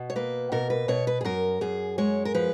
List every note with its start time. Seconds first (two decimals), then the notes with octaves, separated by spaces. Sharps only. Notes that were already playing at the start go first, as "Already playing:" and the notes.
Already playing: B2
0.10 C#5
0.16 A#3 B4
0.52 B2 A#4
0.70 B4
0.88 B2 C#5
1.07 B4
1.21 G#4
1.25 F#2 A#4
1.61 F#2 G#4
1.98 G#3 C#5
2.25 A#4
2.34 F3 B4